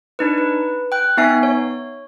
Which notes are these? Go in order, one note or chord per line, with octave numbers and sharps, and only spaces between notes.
D4 D#4 B4
B4
G5 F#6
B3 D#4 E5 G#5 C7
C#5